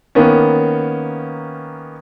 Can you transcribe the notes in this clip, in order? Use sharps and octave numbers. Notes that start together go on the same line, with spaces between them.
D#3 A#3 B3 C#4